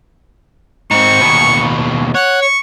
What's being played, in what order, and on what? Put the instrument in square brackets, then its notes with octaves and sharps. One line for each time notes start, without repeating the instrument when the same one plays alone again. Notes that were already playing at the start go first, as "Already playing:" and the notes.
[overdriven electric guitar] G#2 C4 [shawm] C#6
[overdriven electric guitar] D#2 B2
[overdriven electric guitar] C#5 [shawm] F#5
[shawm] C#6